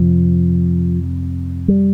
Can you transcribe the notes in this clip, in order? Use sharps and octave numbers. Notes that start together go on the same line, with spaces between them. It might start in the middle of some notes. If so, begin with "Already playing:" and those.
Already playing: F2 C3 F3
G3